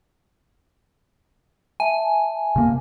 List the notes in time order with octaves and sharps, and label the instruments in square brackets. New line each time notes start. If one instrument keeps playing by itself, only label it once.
[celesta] E5 A5 [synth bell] G#5
[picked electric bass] C3 A#3